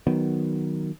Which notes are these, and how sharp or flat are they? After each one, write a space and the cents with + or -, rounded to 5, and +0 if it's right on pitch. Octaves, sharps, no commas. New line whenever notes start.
D#3 +0 F#3 +0 B3 +10